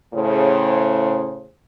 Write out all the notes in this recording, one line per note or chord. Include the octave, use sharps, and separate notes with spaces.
A2 C#3 C5